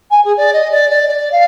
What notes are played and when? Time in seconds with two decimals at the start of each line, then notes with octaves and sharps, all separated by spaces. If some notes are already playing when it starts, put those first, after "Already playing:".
0.10 G#5
0.24 G#4
0.37 D5
0.53 D#5
0.71 D5
0.90 D5
1.08 D5
1.31 F5